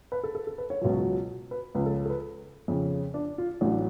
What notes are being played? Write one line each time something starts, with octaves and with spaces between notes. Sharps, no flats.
B4
A4
A4
A4
B4
C#5
C#2 B2 F#3
B4
C#2 C#3 F3 B4
A4
A4
B4
F2 C#3 F3
D4
F4
A1 A2 F#3 D4